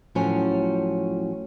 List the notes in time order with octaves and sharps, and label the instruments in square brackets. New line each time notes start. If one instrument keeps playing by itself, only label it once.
[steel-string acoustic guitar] A2 F3 F#3 C#4